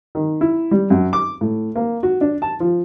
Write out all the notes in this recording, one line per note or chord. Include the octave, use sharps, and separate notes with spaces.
D#3
E4
G3
F#2
D6
A2
A#3
F#4
D4
A5
F3